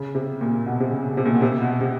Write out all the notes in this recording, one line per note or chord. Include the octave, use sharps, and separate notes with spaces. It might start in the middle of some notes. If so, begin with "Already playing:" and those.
Already playing: C#3
C3
A#2
B2
C3
C#3
C3
A#2
B2
C3
B2
C3